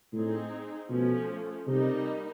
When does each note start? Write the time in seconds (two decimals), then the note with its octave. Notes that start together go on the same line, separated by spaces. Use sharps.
0.13 A2 C4 D#4 G#4
0.89 B2 F3 A3 C#4
1.66 C3 G3 A#3 D#4